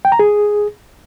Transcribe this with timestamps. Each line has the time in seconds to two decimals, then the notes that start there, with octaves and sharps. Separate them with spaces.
0.05 G5
0.12 A#5
0.19 G#4